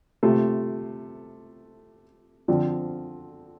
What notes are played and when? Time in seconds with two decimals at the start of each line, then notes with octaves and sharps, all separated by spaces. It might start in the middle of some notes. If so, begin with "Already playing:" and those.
0.23 C3 A3 F4
2.48 D3 F3 C4 F4